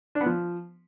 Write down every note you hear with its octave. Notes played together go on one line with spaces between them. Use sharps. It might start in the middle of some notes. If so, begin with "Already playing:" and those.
D4
B3
F3